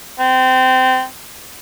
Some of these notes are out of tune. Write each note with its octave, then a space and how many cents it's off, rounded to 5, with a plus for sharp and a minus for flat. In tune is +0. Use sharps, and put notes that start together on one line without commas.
C4 -25